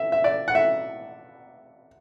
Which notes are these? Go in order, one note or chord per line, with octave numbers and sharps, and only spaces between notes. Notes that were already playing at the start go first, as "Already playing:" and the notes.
Already playing: E5
E5
D5
F#5
E5